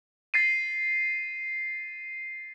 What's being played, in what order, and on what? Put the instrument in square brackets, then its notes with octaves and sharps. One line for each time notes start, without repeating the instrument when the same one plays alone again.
[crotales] A6 C7 D#7